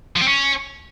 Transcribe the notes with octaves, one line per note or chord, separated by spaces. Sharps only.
F3
C4
C#4